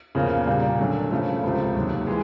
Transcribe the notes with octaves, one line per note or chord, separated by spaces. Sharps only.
E2 C#3 F3 A#3
A#2 G3 A#3
D3 F#3 A3
C#3 F3 A3 C#4
C#2 C3 F3
D#2 D#3 F#3
E3 G#3